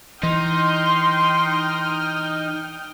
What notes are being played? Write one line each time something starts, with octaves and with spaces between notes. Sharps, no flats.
E3 D#4 G5 C6 D#6 F6